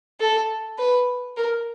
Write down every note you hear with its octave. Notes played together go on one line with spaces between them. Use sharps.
A4
B4
A#4